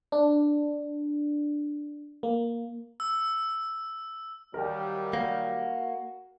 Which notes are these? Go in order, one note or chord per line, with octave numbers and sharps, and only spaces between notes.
D4
A#3
E6
D#2 D#3 F#3 G3 A#4 G5
A#3 F#4